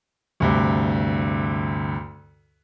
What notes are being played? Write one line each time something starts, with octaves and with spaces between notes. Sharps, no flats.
D2 G2 C3